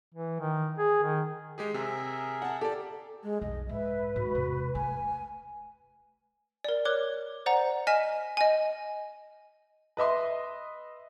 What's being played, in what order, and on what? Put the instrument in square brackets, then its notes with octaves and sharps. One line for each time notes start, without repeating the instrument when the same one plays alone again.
[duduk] E3
D#3
G#4
D#3
[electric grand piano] G#3 G4 G#4
[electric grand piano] C3 [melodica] G#4 A#4 E5
[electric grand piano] F#5 A5 [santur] E6
[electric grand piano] G4 D5 [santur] A4
[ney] G#3
[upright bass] B1 F2 [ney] D#5
[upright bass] G#2 [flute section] B4 [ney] E5
[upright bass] D2 G#2 [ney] F#4
[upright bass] E1 C3
[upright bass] A3 [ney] G#5
[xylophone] A#4 D5
A#4 C#5 D6 F#6
C5 D5 F#5 A#5
D#5 G#5 F6 B6 E7
D#5 G#5
[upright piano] B4 D#5 E5 C6